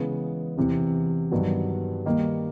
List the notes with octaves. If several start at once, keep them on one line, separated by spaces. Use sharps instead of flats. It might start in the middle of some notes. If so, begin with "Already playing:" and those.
Already playing: C#3 E3 G#3 B3
E2 C3 E3
G2 D#3 F#3 B3 D4
D#3 G3 A#3 D#4